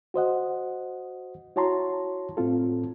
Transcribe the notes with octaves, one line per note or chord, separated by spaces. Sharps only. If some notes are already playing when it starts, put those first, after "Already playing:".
F#4 C5 D#5 F#5
E4 F#4 C#5 A5 A#5 C6
A2 C4 F4 A4